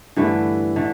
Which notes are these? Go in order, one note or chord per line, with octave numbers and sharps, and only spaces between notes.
G2 D3 E3 A3
D3 A3